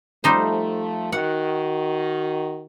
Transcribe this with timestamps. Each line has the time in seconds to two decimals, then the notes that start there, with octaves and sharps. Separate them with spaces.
0.24 F3 G3 A3 D#4 C5
1.12 D#3 F#4 F#5